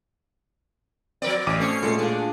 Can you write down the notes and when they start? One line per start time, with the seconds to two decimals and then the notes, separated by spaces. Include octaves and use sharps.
1.22 F3 C4 A#4 D5
1.47 A1 B2 D6 D#7
1.60 A3 C4 C#4 C7 C#7
1.83 A#2 G#3 A3 F#4
1.99 D4 F4 G#4